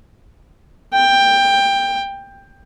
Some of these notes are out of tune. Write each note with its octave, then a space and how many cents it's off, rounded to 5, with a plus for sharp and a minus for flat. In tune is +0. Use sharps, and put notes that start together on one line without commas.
G5 +15